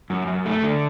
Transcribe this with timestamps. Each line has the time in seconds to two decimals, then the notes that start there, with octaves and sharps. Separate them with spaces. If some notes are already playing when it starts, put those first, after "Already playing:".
0.10 F#2
0.27 F#2
0.45 A3
0.63 D3